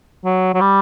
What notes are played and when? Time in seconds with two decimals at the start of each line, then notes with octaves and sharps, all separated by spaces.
0.24 F#3
0.54 F#3
0.60 G3